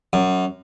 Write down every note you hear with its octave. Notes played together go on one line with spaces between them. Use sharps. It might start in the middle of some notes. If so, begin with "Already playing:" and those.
F#2